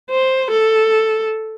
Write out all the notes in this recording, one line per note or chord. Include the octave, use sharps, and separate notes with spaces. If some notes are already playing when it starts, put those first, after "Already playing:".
C5
A4